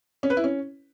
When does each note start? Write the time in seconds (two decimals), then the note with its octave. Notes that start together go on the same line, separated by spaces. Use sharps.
0.23 C#4
0.30 B4
0.37 E4
0.44 C#4